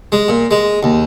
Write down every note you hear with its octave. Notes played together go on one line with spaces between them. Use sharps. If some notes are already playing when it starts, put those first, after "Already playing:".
G#3
A#2
G#3
D#2